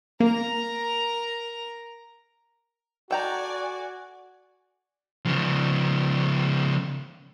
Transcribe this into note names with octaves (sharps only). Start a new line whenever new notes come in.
A#3 A#4 A#5
F#4 A4 D5 G5 G#5 A#5
C#3 F3